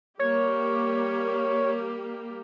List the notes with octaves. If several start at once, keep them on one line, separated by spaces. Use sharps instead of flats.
G3 A#3 G4 C#5